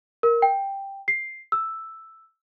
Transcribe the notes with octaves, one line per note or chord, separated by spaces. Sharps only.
A#4
G5
C7
E6